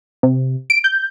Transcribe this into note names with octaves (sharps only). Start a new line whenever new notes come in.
C3
D7
G6